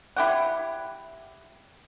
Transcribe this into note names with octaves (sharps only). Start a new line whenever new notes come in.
E4 G4 F#5